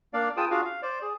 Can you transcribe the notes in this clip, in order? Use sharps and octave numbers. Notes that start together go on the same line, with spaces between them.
A#3 D4 D5 F5
F4 G#4 B4 G5 A5 D#6
D4 F4 F#4 G#4 F5
F5
C5 D5
G#4